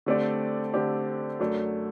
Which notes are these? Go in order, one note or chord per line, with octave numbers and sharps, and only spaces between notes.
D3 A3 C4 G4 D5
D3 A3 C4 G4 D5
F#2 F#3 A3 D4